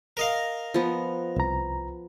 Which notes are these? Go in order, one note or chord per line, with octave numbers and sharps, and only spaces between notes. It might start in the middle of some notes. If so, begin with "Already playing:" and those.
A#4 D#5 F5
F3 B3
C2 A#5